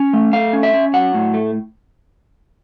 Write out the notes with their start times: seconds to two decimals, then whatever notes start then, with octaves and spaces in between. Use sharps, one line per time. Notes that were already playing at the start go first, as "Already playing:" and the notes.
Already playing: C#4
0.13 A3
0.33 A3 F5
0.53 C#4
0.63 E5
0.73 C#4
0.93 F#3 F#5
1.14 A2
1.34 A3